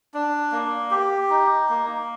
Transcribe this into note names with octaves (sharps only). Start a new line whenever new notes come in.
D4
A#3
G4
D#4
A#3